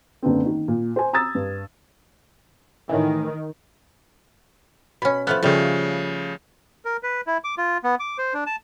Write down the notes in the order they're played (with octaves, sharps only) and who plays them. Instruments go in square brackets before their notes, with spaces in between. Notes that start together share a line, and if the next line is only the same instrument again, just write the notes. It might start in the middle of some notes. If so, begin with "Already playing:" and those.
[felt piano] F#1 D3 B3 C4
D#3
A#2
C5 G#5
A#5 D#6 E6 G#6 A6
G2
[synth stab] A2 E3 [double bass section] D#3
[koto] B2 C#4 [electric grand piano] B5
[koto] F3 A3 B3 [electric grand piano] B5 F6 F#6
[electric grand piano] C#3 F3 [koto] G3 A3
[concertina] A#4
B4
E4
D6
F4
B3
D6
C5
D4
A5